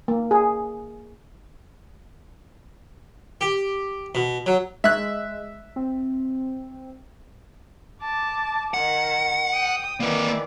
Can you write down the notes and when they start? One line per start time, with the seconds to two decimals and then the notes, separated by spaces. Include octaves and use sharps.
0.08 A#3
0.31 G#4
3.41 G4
4.15 B2
4.46 F#3
4.84 G#3 E5 F#6
5.76 C4
8.01 A5 D6
8.74 D#3 F#5
9.53 G5 D#6
10.00 D#3 E3 A#3 B4 D5